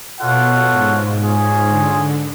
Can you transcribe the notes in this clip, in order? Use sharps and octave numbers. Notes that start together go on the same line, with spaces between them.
B2 F4 A4 C#5 F#5
G#2
G#2 C#4 F4 G#4
D3